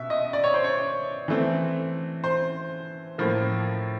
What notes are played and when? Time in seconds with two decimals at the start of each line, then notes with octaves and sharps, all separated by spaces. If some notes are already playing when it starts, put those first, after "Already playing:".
Already playing: B2 E5
0.10 D#5
0.33 D5
0.44 C#5
0.54 C5
0.64 C#5
1.28 E3 A3 C4
2.24 C5
3.18 A2 F3 A#3